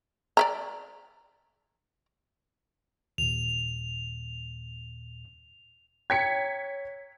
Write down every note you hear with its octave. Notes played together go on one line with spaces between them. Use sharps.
D5 E5 A#5
D#2 A#2 F7
C#5 G5 A#5 G#6 B6 C#7